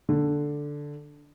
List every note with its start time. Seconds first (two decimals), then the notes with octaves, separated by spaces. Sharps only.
0.09 D3